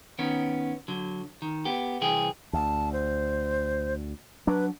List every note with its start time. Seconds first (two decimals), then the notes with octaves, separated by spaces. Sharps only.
0.19 D#3 B3 C#4
0.88 D3 F#3
1.42 D#3
1.65 B3 G4
2.01 C2 E3 G#4 G5
2.53 D2 A5
2.93 C5
4.47 F#3 D4 B4